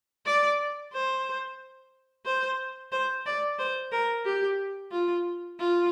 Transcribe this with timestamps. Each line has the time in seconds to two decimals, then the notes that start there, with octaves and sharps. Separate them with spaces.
0.26 D5
0.93 C5
2.25 C5
2.92 C5
3.26 D5
3.58 C5
3.92 A#4
4.25 G4
4.91 F4
5.59 F4